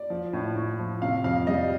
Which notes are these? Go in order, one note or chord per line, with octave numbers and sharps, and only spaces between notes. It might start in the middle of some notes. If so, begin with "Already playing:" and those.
Already playing: D5
F3
A2
A2
F3
C3 F5
F2 F5
G3 D#5